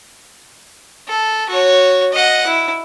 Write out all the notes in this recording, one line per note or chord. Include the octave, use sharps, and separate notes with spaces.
A4
F#4 C#5
D#5 F#5
E4